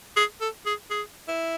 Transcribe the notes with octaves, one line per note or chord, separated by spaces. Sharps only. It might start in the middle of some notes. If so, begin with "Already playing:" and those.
G#4
A4
G#4
G#4
E4